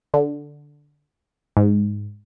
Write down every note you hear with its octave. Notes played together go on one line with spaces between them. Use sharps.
D3
G#2